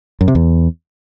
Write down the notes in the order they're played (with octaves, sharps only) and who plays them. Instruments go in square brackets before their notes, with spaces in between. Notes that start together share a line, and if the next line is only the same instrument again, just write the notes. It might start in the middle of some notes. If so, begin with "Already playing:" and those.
[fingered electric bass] F#2
C3
E2